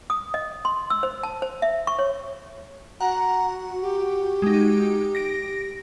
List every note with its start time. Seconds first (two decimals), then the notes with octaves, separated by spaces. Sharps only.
0.10 D#6
0.34 D#5
0.65 C6
0.90 E6
1.03 C5
1.23 A5
1.42 C5
1.62 E5
1.87 C#6
1.99 C#5
3.01 F#4 F#5 A#5
3.82 G4
4.42 G#3 D#4
5.15 A#6 D7